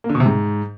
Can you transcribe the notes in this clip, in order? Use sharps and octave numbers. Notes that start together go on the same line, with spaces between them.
A#3
D3
B2
C3
G#2